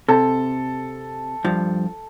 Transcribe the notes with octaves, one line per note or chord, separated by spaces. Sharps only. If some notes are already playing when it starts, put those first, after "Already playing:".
C3 A4
G2 F3